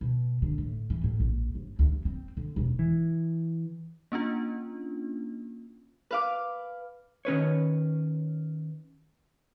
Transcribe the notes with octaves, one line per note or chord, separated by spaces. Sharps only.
B2
D3
A2
E3
A2
A#1
G1
D2
F#2
C4
D3
E1
E3
A#3 C#4 D4 F4
B4 F5 D6
D#3 C#4 B4 C#5